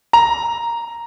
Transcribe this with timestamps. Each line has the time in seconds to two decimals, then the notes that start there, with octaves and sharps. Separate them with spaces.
0.13 A#5